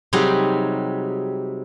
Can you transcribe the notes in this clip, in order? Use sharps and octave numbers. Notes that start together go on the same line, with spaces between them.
C3 F#3 G3 D#4 G#4